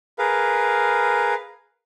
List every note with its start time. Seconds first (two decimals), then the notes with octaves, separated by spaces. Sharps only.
0.19 G#4 A#4 B4 F5